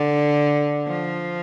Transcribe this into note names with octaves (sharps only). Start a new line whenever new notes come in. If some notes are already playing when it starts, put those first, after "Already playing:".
Already playing: D3
F3